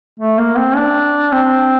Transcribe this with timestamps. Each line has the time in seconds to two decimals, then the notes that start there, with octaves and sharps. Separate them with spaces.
0.20 A3
0.38 A#3
0.57 C4
0.76 D4
1.32 C4